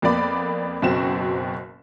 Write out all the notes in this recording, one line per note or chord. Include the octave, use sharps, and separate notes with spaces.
F2 A#3 B3 D5 B5
F#1 F#2 B2 C4 F#4 E7